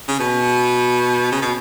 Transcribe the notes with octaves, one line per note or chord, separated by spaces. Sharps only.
C#3
B2
C#3
B2